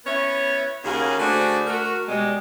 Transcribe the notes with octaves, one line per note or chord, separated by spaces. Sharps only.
B3 C#4 E4 C#5
D#2 C#3 A#3 C#4 F#4 G#4
D3 A3 D4 F#4 G#4 C5
A3 F#4 A#4
B2 G3 G#3